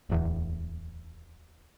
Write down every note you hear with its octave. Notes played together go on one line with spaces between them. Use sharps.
D1 E2